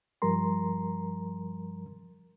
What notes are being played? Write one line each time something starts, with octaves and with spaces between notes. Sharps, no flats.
G2 F3 G3 A#4 A#5 C6